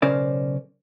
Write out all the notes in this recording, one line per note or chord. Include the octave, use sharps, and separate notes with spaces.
B1 C#3 C#4 A#4 C5 D5